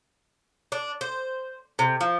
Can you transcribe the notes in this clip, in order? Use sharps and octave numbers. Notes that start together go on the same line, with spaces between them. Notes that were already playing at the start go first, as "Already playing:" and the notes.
D4
C5
C3
F3